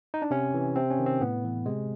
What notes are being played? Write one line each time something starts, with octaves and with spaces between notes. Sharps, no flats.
D#4
D4
C3 C#4
E3
C3 C4
C#4
D#3
C4
A2 B3
E3
C3 G#3